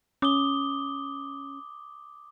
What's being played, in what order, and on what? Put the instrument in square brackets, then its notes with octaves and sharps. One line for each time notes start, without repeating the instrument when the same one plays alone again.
[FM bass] C#4 [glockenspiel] D6 D#6 G7